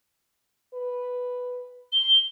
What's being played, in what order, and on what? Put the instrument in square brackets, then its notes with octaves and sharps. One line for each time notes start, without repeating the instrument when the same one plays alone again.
[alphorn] B4
[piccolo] G7